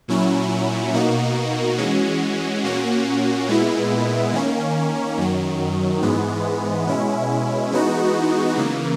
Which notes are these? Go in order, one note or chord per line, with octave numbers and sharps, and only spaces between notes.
A#2 F#3 C#4 E4
B2 A#3 D#4 F#4
E3 G#3 C#4 F#4
A#2 A#3 C#4 F#4
A#2 G#3 B3 E4
D#3 A#3 C#4
F#2 D#3 F#3
G#2 E3 G#3 B3
B2 G#3 C#4 E4
E3 G#3 B3 D#4 F#4
C#3 E3 A#3